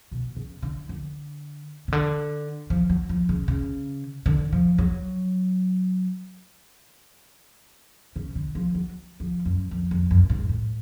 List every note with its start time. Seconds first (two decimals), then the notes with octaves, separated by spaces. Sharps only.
0.12 B2
0.36 C#3
0.62 D3
0.89 D3
1.88 C#3
1.92 D3
2.70 F3
2.90 F#3
3.09 F3
3.29 C#3
3.48 C#3
4.26 D3
4.52 F3
4.78 F#3
8.16 C#3
8.35 D3
8.55 F3
8.75 F#3
9.20 F3
9.46 F#2
9.71 F2
9.91 F2
10.11 F#2
10.30 G#2
10.49 A2